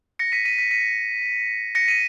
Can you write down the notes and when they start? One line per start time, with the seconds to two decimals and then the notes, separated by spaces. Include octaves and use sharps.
0.19 A#6 C#7
0.32 B6 D#7
0.45 B6 D#7
0.58 B6
0.71 B6 D#7
1.75 A#6 C#7
1.88 B6 D#7